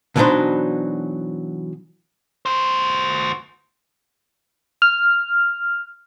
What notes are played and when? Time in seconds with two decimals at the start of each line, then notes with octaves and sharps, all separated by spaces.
0.16 B2 E3 F#3 D4 D#4 C5
2.46 F#4 C5
4.82 F6